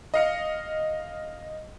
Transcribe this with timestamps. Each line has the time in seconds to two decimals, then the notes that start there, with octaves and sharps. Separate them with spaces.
0.14 D#5 F5 C#7